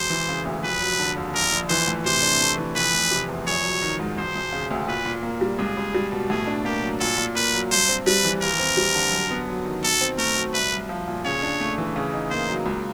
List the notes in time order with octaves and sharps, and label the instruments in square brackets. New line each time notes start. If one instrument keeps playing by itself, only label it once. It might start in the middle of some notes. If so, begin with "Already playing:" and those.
Already playing: [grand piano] E1 [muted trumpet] C5
[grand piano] E3
C#3
D2
[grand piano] F1 [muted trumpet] B4
[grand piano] F#3
D3
D#2
[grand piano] A#1 [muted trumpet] A#4
[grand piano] A#1
[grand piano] E3 [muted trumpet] C5
[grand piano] A2
[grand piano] C3 [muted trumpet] C5
[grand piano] D4
A3
E3
[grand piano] F1 [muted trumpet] B4
[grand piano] F1
C3
E2
[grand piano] A#1 [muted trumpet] C#5
[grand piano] F#3
D#3
G#2
[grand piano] E1 [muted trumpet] C5
[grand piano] E1
C#3
D2
[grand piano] A#2 [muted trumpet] B4
[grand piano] A#2
A#3
G3
[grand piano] C#2 [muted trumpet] G#4
[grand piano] C#2
G3
B2
[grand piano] A2 [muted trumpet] G#4
[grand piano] D4
[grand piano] A#3 [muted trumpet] G4
[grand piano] F#3
[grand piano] A#2 [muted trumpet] A4
[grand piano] A#2
[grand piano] A#3 [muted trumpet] B4
[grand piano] F#3
[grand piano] G2 [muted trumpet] C5
[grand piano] C4
[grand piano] G3 [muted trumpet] B4
[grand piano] E3
[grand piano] D#2 [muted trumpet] A#4
[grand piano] C4
G3
D3
F#2
B3
F#3
D#3
[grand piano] B2 [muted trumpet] A4
[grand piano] C4
[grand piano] A3 [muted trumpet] A#4
[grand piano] F#3
[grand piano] C2 [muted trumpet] B4
[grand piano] C2
F3
A#2
[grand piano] C#3 [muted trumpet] C#5
[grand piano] D4
A3
E3
C#3
D#4
[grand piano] A#3 [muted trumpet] C5
[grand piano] F#3
C#2